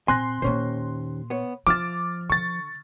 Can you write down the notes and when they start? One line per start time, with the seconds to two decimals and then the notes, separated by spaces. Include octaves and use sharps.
0.08 A#2 C4 G#5 C6 F#6 A#6
0.42 D#2 A#2 A#3 C#4 C5
1.30 B3 C#5
1.67 F3 F4 E5 D6 F6 A6
2.30 D3 C#6 A6